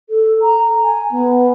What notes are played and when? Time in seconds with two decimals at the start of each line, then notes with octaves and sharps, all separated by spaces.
0.10 A4
0.42 A#5
0.83 G#5
1.11 B3